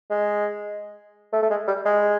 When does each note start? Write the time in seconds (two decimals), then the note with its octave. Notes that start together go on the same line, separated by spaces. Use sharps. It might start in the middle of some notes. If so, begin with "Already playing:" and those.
0.10 G#3
1.32 A3
1.43 A3
1.50 G#3
1.68 G3
1.85 G#3